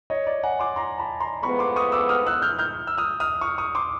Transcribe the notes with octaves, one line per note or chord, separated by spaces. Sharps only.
C#5 D#5
D5
F#5 G#5
C6 D6
A#5 C6
A5 B5
A#5 C6
A2 F3 G#3 B3 B5 C#6
C6 D6
C#6 D#6
D6 E6
D#6 F6
E6 F#6
F6 G6
F6 G6
E6
D#6 F6
D#6 F6
C#6 D#6
C#6 D#6
C6 D6